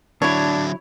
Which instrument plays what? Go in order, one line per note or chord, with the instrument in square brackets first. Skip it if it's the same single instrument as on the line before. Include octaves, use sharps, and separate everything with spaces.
[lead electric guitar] D3 F#3 [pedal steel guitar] D4 [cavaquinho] E4 C#5